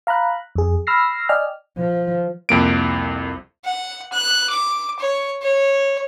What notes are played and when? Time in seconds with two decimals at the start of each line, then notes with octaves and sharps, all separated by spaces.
0.07 F5 A#5 B5 F#6
0.55 F2 G#4
0.87 B5 E6 F6 A#6 C7
1.29 D5 D#5 G5 G#5 F6
1.78 F3
2.49 C2 F2 A#3 D7
3.64 F#5
4.12 F#6
4.49 D6
4.99 C#5
5.41 C#5